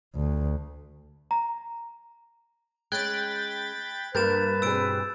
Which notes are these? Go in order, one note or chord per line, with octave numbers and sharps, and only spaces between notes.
D2
A#5
G#3 C#4 G5 B5 F#6 G#6 A6
G2 A#3 A#4 B4 G6 A6 E7
B2 C4 G#4 E6 D7